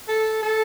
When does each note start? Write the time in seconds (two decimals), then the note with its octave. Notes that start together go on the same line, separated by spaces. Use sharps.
0.08 A4
0.43 A4